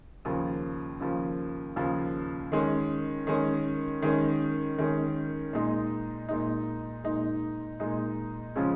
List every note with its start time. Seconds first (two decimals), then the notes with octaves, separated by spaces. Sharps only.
0.25 D#2 C#3 F3
1.00 D#2 C#3 F3
1.76 D#2 C#3 F3
2.52 D#3 G#3 C#4
3.27 D#3 G#3 C#4
4.02 D#3 G#3 C#4
4.78 D#3 G#3 C#4
5.53 A#2 G#3 D#4
6.29 A#2 G#3 D#4
7.04 A#2 G#3 D#4
7.80 A#2 G#3 D#4
8.55 C#3 F3 G#3 C#4